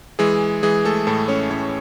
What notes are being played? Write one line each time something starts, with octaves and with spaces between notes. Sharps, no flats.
E3 G#3 G#4
E3 G#3 G#4
A3 A4
A2 A3 A4
C#4 C#5
A2 C#4 C#5